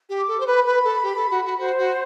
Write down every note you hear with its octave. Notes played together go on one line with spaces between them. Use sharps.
G4
D6
A4
C5
B4 B5
B4
A4
G4
A4
F#4
F#4
F#4 C5
F#4